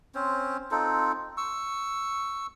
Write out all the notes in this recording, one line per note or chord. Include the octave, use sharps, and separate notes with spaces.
C4 C#4 C5
C4 D#4 F4 A4
C#6 E6